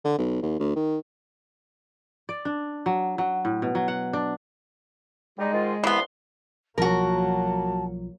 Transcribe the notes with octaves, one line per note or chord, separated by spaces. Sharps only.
D3
B1
D#2
D2
D#3
D5
D4
F#3
F#3
A2
B2
F#3
F#5
D4
G3 G#3 D#4
G#2 D#3 F4
C2 G2 E3 B3 C6
B1 F3 F#3 A#3 F#4 A#4 A5